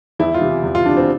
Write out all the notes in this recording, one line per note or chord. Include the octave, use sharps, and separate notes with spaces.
E2 E4
F4
C3 E3
E2
F4
C3 E3 D4
C4